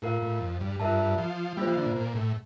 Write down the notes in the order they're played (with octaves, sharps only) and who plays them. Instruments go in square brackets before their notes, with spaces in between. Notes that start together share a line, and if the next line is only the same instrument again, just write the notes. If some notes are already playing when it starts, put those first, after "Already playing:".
[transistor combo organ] A2 [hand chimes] F4 A#4 F5
[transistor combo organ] A2
F2
G2
[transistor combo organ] G2 [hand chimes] F4 A#4 E5 A5
[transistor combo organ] F3
[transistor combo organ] G3 [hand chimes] A#3 F4 C5
[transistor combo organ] F3
D3
A#2
A#2
A2